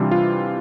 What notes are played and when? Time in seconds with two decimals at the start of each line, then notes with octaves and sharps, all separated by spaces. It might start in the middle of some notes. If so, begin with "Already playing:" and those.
Already playing: C3 E3 G3 D4 F4
0.11 F4